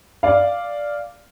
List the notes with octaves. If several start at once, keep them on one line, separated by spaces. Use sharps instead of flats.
D5 F5